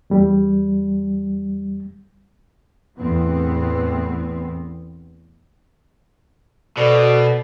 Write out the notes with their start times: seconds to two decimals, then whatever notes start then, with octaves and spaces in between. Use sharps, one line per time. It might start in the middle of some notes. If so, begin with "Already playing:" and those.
0.10 E2 G3
2.97 E2 A2 B3 C4
6.77 B2 A4 C5 D5